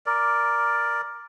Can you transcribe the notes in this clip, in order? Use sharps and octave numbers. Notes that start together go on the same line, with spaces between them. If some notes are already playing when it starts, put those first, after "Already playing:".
A#4 D5